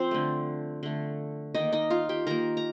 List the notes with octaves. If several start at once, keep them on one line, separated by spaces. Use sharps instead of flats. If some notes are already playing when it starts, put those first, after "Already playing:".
Already playing: F3 C4 C5
D3 A3
D3 A3
D#3 A#3 D#4 D#5
D#4 D#5
F4 F5
G4 G5
D#3 A#3 A#4 A#5
A#5